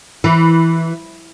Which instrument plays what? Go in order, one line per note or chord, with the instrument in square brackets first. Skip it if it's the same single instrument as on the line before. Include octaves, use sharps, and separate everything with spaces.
[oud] E3